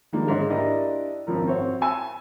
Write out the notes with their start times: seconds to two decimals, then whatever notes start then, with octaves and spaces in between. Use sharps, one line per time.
0.13 D#3 F3 G3 G#3 A#3 D4
0.28 G#2 D3 C#5 D#5
0.50 D4 E4 G4 A#4 D5 D#5
1.27 G#1 F#2 F3 A#4
1.47 C4 F#4 C5 C#5
1.81 G#5 E6